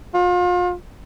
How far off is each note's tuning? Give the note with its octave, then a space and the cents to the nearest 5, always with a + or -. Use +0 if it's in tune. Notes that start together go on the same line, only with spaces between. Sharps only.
F4 +35